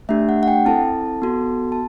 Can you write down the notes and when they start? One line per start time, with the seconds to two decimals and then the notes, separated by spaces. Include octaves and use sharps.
0.09 A3 D4 G4 E5
0.29 F#5
0.43 F#5
0.48 G5
0.65 C4 E4 A4 A5
1.22 B3 F#4 A4
1.72 A5